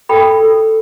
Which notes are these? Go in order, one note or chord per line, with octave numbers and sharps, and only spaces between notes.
A4 G5 B5
A4